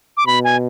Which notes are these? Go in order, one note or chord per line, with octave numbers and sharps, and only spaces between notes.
D6
B2 B5
G#5